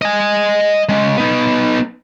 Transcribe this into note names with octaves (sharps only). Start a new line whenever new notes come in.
D#5 G#5
G#3 C#4
B3 D#4